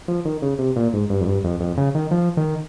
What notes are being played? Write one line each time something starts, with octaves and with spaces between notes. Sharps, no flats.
F3
D#3
C#3
C3
A#2
G#2
G2
F2
G2
F2
F2
C#3
D#3
F3
D#3